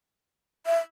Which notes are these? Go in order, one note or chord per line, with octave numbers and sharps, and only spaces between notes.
E5